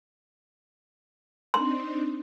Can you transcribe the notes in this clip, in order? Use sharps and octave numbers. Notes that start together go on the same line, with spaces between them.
C4 D4 D#4 C6